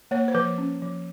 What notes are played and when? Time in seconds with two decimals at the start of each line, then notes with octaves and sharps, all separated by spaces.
0.11 A#3 C#5
0.28 C5
0.34 F3 B4
0.58 C#4
0.82 F3